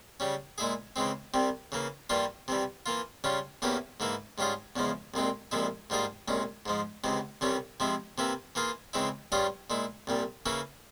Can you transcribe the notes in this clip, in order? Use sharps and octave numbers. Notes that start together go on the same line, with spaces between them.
C#3 G3 C#4
A#2 G#3 E4 G#4
C#3 E3 G#3 C4
C2 C3 G3
C#3 E3 A#3
G2 E3 G3 A#3 F4
C3 E3 G3
E3 A#3 F4
C#3 G3 C#4 F4
E2 E3 A#3 C#4 G4
G#2 E3 A#3 E4
G#2 G3 C#4 F4 G#4
E2 C#3 F3 G#3
C2 A#2 G#3 C4
C2 A#2 F3 G#3 E4
G#2 G3 A#3 F4 G#4
C2 A#2 G#3 C#4
G#2 F3 G#3
C#2 C3 E3 G#3
C2 C3 E3 G3 C#4
C3 F3 G#3 E4
C3 E3 A#3 E4
E3 A#3 F4 G#4
C#3 E3 G#3 C4 E4
G2 G3 C#4 F4 G#4
A#2 G#3 E4
C2 A#2 G3
C#3 E3 A#3 C#4 E4